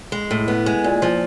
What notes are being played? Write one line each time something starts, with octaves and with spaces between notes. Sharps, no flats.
G#3
A2
B3
G#3
A#2
F3